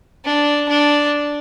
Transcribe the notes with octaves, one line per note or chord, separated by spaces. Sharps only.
D4
D4